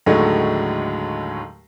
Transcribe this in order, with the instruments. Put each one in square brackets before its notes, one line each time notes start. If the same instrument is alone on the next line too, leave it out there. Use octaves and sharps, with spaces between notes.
[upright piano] D#2 A2 D3 F#3 G#3 A3